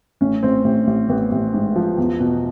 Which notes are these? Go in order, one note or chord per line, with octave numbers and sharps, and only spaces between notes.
A1 C#4
A1 C4
A1
A1
A1 B3
A1
G#2
F3
E2
B2